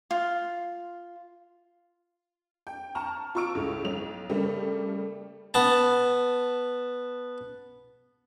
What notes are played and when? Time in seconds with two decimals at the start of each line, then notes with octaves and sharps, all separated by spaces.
0.11 F4
2.67 G5
2.95 A5 A#5 C#6 F6
3.35 F4 A#5 C#6 E6 D7
3.55 C#2 A2
3.85 B1 F7
4.29 C#3 G3 A3 A#3
5.54 B3 A5